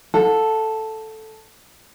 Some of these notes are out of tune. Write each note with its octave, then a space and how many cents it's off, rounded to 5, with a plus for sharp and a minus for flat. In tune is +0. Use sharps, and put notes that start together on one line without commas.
A4 +0 F#5 -35